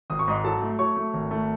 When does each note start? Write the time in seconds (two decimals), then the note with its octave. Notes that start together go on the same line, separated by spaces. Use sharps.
0.10 G#1 D#6
0.19 C#6
0.28 G#2 D#5 D#6
0.44 F#3 A4 A5
0.61 A3
0.79 F#3 C#5 C#6
0.96 A3
1.14 G#1
1.31 A3